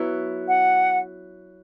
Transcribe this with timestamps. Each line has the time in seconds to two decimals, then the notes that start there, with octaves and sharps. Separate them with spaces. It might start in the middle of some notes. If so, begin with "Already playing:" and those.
Already playing: F#3 B3 E4
0.48 F#5